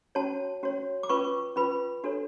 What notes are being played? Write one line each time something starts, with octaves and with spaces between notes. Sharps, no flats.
C#4 F#4 C#5 A5
C#4 F#4 C#5
D6
C#4 F4 B4 C#6
C#4 F4 B4 B5
D4 F#4 A4 C#5